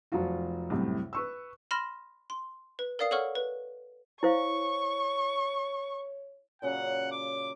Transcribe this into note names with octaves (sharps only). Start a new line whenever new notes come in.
F1 F3 F#3 F4 F#4
C2 F#2 A2 C3
B4 C#6 E6
B5 C6 F6 A#6 E7
C6
B4
A#4 D5 F5 D#6 C7
A4 C#5 F#5 C#6 F6
B4
E4 C5 C#5 F5 C#6
A#2 C#3 F#3 F#5
D6